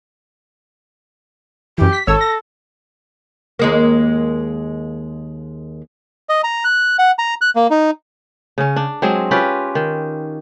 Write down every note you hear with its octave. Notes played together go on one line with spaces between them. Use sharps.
F#2 E3 G4
B6
G#1 A4 C#5 E6
A#6
D#2 G#3 A#3
D#5
A#5
F#6
F#5
A#5
F#6
A#3
D#4
C#3 C#4
D4
F#3 G#3 C4 G#4
C#4 F4 G4 B4
D#3